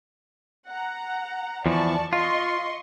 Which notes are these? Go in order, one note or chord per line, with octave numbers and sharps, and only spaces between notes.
F#5 A#5
E2 E3 F3 D5 A5 C#6
F4 D#5 C6 C#6